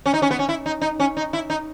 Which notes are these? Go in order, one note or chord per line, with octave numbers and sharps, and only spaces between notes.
C#4
D#4
C#4
B3
C#4
E4
D#4
D#4
C#4
D#4
E4
D#4